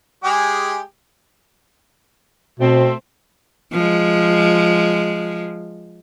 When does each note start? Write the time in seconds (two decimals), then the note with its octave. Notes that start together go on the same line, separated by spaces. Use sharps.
0.24 G#3 G4 G#4
2.59 B2 A3 C4
3.72 F3 G#3